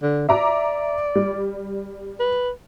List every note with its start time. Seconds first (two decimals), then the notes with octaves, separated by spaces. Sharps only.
0.02 D3
0.29 D5 E5 A#5 D6
1.15 G3
2.20 B4